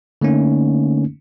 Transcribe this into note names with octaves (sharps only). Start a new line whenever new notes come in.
D3 A3 A#3 C#4 D#4